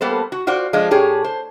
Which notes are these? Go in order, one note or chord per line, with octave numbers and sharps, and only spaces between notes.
G3 A#3 B3 A4 C5
F#4
F4 F#4 C5 D5 F#5
F3 G#3 D4 F4
A2 G4 G#4 C#5
C5